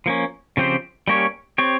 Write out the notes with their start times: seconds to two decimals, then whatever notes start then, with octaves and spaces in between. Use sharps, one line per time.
0.06 F3 A#3 C#4
0.57 C#3 F3 C4 G4 C5
1.08 G3 A#3 C#4 G4 C#5
1.58 C4 G4 C#5